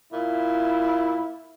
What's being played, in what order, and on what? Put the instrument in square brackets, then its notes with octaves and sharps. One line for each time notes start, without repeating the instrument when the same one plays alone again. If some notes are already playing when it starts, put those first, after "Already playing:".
[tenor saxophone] A#2 [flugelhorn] E4